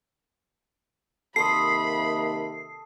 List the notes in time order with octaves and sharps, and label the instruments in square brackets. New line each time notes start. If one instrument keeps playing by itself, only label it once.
[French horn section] C3 D#3 A#3 [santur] A4 C6 D#6 [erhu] B5 [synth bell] C7